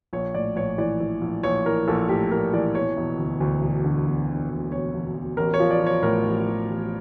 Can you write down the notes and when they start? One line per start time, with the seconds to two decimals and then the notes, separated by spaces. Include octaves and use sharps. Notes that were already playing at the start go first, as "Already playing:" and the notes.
0.13 A#1 C#5
0.34 A2 D5
0.56 A#1 C#5
0.78 E3 D5
1.00 E3
1.22 A#1
1.43 A#1 C#5
1.66 E3 A#4
1.87 A#1 A4
2.09 A2 G4
2.31 A#1 A#4
2.53 E3 D5
2.75 E1 C#5
2.97 E1
3.19 D2
3.40 D2
3.62 E1
3.84 D3
4.06 E1
4.28 D3
4.50 D2
4.72 E1 C#5
4.94 E1
5.15 E1
5.37 A1 A#4
5.54 C#5
5.60 F3
5.71 D5
5.81 F3
5.86 C#5
6.03 A2 A#4
6.25 A1
6.47 A1
6.69 A1